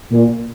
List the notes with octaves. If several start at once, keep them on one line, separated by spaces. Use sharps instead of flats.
A#2